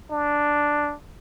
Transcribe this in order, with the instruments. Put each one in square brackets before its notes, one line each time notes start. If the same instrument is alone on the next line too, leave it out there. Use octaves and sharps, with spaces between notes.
[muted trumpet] D4